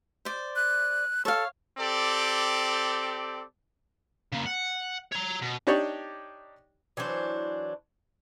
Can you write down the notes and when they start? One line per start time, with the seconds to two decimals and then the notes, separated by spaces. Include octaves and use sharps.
0.25 C5 D5
0.56 F#6
1.25 A4 C#5 F5
1.78 C4 G4 A4 D5
4.32 C#3 A#3
4.46 F#5
5.12 C#5 A#5
5.42 B2
5.67 D4 D#4 G4 C#5 D5 C#6
6.97 E3 F#3 D4 C5